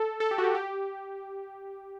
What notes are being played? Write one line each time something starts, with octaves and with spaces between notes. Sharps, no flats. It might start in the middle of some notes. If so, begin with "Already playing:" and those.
Already playing: A4
A4
G4
F#4
G4
G4